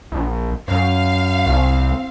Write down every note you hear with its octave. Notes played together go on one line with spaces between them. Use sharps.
A#1
F#2 F5
C2 C4